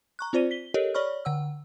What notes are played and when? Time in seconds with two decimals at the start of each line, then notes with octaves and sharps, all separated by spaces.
0.19 A#5 C#6 F#6
0.33 C4 F4 C5 D5 D#7
0.51 B6 G7
0.74 G4 A4 A#4 C#5 D#5
0.94 C#5 D5 B5 C#6 F6
1.25 D3 F#5 E6